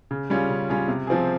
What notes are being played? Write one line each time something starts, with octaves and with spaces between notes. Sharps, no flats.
C#3
G3 C#4 F4 G#4
C#3
G3 C#4 F4 G#4
C3
F3 C4 F4 G#4